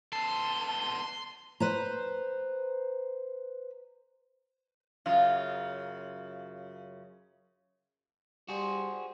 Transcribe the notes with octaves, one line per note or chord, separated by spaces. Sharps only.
B3 A4 C6
B4 C5 A#5
F#2 C#3 F4
G3 F#4 G#4 C5